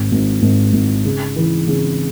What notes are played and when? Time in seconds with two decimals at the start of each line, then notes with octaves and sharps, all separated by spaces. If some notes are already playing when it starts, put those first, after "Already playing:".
Already playing: G#1
0.12 G#1
0.42 G#1
0.73 G#1
1.05 C#3
1.36 E3
1.68 C#3